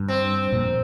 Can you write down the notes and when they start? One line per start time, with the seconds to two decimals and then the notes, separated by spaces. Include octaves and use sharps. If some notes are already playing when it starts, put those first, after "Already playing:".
Already playing: G2
0.08 C4
0.52 F2 A#2